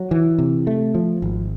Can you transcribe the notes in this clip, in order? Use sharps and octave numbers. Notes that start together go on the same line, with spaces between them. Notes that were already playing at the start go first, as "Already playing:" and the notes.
Already playing: F#3
E3
C3
A3
F3
G#1